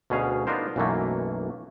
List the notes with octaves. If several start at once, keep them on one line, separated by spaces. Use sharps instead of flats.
D2 B2 C#4 G#4 F5
B3 D4 D#4 F4 A#4 C5
B1 F#2 E3 F#3 A3 A#3